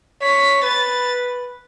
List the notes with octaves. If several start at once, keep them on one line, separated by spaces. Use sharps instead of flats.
C#5 B6
B4 A6